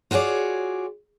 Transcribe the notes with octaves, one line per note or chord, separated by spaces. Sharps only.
F4 F#4 G#4 C#5 D5